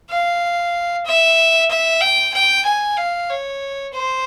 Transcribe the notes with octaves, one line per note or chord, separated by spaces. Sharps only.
F5
E5
E5
G5
G5
G#5
F5
C#5
C5